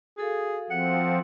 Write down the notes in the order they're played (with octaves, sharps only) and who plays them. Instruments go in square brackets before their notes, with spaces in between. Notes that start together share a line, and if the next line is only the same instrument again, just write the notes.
[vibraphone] F#4 A4 F5 [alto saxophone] G#4
[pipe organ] F3 C4 [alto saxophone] F#5